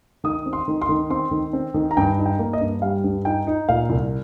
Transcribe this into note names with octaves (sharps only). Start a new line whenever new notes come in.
D#3 D#6
C4
C6
D#3
C6
D#3
C4 C6
D#3
C4
D#3
A#5
G2 G5
D#4
G5
A#3
D#5
G2
G3 F5
G2
D#4 G5
D#4
A#2 F5
C2